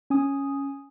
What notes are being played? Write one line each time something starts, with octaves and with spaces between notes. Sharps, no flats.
C#4 G#5 D#6